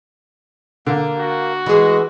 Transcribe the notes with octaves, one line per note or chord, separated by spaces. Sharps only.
D3 A#3
F#4
E3 G#3 G#4